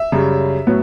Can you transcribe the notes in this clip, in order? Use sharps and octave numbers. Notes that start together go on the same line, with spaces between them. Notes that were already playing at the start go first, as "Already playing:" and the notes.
Already playing: E5
F#2 C#3 G3
A2 F#3 B3